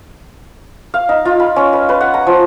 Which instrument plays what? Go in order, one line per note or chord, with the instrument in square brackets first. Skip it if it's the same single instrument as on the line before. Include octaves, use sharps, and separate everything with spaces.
[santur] F5
D#4
F4
B5
C#4
B4
B4
F#5
A#5
F3